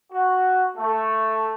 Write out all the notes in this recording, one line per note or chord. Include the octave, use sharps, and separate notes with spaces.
F#4
A3